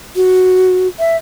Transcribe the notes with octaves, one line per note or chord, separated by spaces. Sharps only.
F#4
E5